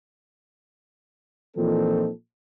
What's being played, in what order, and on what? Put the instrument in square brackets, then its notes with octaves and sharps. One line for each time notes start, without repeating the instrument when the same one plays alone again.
[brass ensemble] A#2 E3 F3 C4 D#4 A4